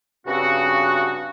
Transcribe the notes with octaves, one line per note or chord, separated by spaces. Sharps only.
G2 C#3 C4 F#4